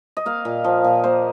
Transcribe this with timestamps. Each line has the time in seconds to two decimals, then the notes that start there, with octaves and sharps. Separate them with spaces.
0.17 D#5
0.26 A#3 F5
0.45 A#2
0.64 F3
0.84 A#2
1.04 A#3 C5